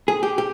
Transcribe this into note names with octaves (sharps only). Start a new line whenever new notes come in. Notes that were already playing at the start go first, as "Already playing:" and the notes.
G#4
G4
G4